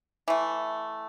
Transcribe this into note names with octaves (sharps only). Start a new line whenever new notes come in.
E3 A3